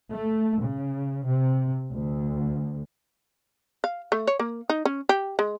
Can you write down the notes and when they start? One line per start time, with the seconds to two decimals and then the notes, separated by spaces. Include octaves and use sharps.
0.12 A3
0.64 C#3
1.27 C3
1.93 D2
3.84 F5
4.12 A3
4.27 C#5
4.39 A#3
4.70 D#4
4.85 C#4
5.09 G4
5.39 G#3